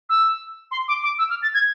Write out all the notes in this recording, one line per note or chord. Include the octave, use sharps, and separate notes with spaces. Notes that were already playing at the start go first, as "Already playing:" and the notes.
E6
C6
D6
D6
E6
F6
A6
G#6